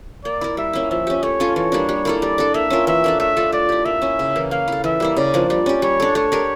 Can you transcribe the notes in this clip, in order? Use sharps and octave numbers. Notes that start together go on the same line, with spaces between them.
A#3 D5
E4 A#4
G3 E5
A#3 C#4 E4
F3 E5
C#4 G4
A3 C#5
C#4 F4 A4
E3 C#5
G3 A#3 D4
G3
A#3 E4 A4
G3 D5
D4 A4
A#3 E5
C#4 F4 A#4
E3 E5
A#3 D4 A4
A3 E5
D4 F4 A4
A3 D5
E4 G4
A#3 E5
C#4 E4
C#3
E3 A#3
A#3 F5
E4 A4
E3 E5
G3 A#3 E4
C#3 D5
F3 A#3 D4
G3 D5
C#4 G4
G3 C#5
D4 A4
A3 C#5
D4 G4 A#4